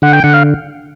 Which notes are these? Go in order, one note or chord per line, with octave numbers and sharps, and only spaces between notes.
D3 F#5
G5
D3 F#5
F5